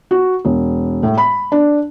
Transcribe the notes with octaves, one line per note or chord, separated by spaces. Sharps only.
F#4
E1
A2
B5
D4